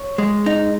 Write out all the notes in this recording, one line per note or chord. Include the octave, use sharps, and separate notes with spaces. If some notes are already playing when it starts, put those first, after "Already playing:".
Already playing: C#5
G#3
D#4